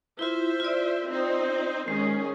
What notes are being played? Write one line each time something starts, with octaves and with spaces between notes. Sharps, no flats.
E4 F4 C5 E5
F4 D5
C4 D#4 C5
D#3 G#3 C#4 G#4